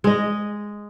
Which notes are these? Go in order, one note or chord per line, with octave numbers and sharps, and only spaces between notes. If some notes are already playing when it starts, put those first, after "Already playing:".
G#3 D#5